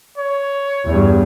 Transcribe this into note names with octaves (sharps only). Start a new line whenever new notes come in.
C#5
E2 G2